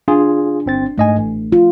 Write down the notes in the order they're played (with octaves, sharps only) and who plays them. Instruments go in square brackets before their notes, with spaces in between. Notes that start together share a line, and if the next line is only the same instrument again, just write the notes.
[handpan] D4 [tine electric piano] F4 G#4
[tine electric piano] G1 C4 A6
[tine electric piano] G#2 D#5 G#5 [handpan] A3
[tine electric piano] A1
[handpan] F4